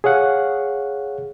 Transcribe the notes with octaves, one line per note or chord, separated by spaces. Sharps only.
G#4 C#5 F5 F#5